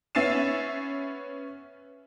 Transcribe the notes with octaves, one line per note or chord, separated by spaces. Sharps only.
B3 C#4 E5 A6 C7 E7